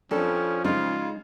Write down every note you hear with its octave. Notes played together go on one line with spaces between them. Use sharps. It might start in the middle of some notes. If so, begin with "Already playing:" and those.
F2 F3 C#4 D4 A4
C#3 G#3 D#4 F4